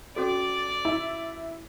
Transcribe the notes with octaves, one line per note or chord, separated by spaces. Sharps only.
C#4 F#4 A4 D5
E4